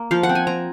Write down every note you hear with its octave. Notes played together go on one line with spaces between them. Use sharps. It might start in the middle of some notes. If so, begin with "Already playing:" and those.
Already playing: A#3
F3 F5
F#5
C4
G#5
C4 A#5